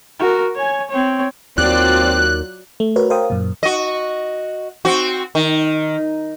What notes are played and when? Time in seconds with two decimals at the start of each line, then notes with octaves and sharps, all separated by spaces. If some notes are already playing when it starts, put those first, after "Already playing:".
0.19 F#4 A#4
0.55 C#5 G#5
0.90 C4 C#5
1.58 D#2 F#3 C4 F4 D5 F#6
2.80 A3
2.96 F#4 A#4 B4 C#5
3.10 A#4 C5 F5 G5 D#6
3.30 F#2 A#2
3.63 F#4 D#5
4.85 C4 F#4
5.35 D#3